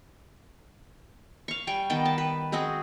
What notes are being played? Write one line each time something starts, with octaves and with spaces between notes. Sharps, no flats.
F5 C#6
G3 G5 G#5 C#6
D#3 B3 G5 A5
A5
B4
G#3 C4 F#4 G#4